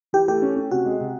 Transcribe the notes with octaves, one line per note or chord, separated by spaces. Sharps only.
E3 G4
A3 G4
C#4
C#4
C3 F#4
G#3
C3